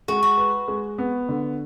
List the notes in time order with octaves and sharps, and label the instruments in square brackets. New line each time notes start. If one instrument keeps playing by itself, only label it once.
[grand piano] G#3 [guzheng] F#4
[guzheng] F#4
[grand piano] B4
G#3
B3
D3